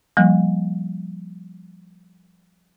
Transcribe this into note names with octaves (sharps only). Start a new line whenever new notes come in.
F3 G3 A#3